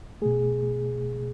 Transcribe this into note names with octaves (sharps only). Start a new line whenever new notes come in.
B2 A3 G#4